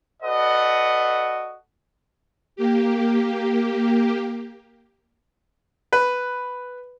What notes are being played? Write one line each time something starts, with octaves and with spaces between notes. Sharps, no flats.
F#4 A4 B4 D5 D#5 F#5
A#3 G4
B4